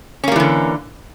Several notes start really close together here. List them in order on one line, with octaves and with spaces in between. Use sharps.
C#4 A#3 G3 E3 D3